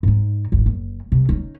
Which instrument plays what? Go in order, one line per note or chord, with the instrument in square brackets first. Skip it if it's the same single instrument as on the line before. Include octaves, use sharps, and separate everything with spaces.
[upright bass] G#2 D#4
D1 G#1
F#1
C3
C#4 D#4